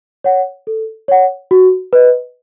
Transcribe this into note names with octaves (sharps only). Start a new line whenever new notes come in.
C#5 F#5
A4
C#5 F#5
F#4
B4 D#5